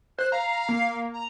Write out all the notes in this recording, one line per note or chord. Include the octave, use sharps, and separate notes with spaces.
C5 F#6
F5 A#5
A#3
A#5